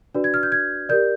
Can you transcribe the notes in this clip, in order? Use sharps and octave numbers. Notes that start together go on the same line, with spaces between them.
D4 F#4 B4 D5
G#6
F6
G6
G#6
G4 A#4 D5 G6